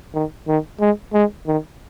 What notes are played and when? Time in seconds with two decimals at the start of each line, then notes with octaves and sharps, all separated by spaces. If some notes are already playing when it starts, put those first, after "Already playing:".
0.14 D#3
0.48 D#3
0.80 G#3
1.14 G#3
1.47 D#3